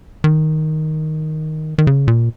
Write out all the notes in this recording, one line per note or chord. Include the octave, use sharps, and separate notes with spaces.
D#3
D#3
C#3
A#2